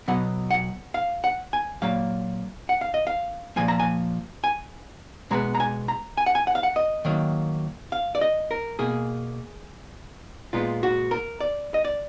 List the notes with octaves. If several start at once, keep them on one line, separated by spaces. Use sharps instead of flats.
B2 F#3 B3 F#5
F#5
F5
F#5
G#5
A#2 F#3 A#3 F5
F#5
F5
D#5
F5
A#2 F3 A#3 G#5
A#5
G#5
G#5
B2 G#3 B3 A#5
A#5
G#5
A#5
G#5
F#5
G#5
F#5
F5
F#5
D#5
D#3 F#3 A#3
F5
D5
D#5
A#4
B2 A#3 G#4
A#2 G#3 B3 F4
F#4
A#4
D5
D#5
D5